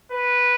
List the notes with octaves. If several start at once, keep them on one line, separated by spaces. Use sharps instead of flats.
B4